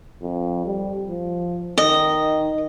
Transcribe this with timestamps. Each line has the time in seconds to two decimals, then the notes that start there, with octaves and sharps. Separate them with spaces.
0.22 F2
0.66 G3
1.08 F3
1.78 D#3 D#5